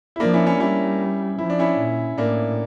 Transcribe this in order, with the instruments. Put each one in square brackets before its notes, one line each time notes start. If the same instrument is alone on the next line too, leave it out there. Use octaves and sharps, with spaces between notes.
[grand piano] E4
[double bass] F3 [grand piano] A#3 D4
[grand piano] C#4 E4
C#4 E4
[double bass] G3 [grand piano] C#4 E4
[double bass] F3 [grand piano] E4
[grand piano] D4
C#4 E4
[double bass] A#2
[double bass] A2 [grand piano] A#3 D4